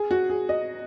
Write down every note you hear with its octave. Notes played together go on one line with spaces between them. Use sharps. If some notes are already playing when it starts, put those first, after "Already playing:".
Already playing: G#4
F#4
G#4
D#5